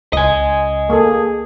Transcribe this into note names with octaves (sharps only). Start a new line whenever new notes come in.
C#2 D#5 G#5
A#3 G#4 A4